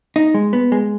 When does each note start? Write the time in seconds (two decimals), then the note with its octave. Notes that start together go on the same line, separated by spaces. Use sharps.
0.16 D#4
0.34 G#3
0.53 B3
0.72 G#3